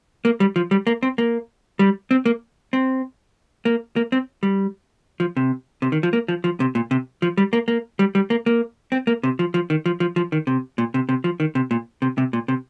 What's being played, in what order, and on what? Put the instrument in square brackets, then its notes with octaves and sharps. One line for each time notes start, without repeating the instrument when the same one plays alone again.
[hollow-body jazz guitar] A#3
G3
F3
G3
A#3
C4
A#3
G3
C4
A#3
C4
A#3
A#3
C4
G3
F3
C3
C3
D#3
F3
A#3
F3
F3
C3
A#2
C3
F3
G3
A#3
A#3
G3
G3
A#3
A#3
C4
A#3
C3
F3
F3
D#3
F3
F3
F3
D#3
C3
A#2
C3
C3
F3
D#3
C3
A#2
C3
C3
A#2
C3